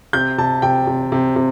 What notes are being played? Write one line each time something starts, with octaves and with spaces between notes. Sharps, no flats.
C3 G6
C3 A5
C3 G5
C3
C3
C3